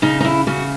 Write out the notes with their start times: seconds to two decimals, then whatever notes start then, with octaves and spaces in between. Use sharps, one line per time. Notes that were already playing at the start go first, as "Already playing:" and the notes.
0.02 C#3 D#4
0.20 D#4
0.25 E4
0.47 C#3 F#4